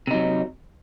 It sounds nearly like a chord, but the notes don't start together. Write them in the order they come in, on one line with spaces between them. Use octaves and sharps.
C3 D#4 F#3